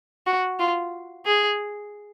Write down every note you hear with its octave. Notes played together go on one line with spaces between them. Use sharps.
F#4
F4
G#4